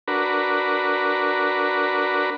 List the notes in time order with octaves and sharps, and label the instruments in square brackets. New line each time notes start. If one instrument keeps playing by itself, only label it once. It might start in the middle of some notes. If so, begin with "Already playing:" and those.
[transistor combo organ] D4 F#4 A#4 B4